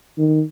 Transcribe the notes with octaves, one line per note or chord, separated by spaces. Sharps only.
D#3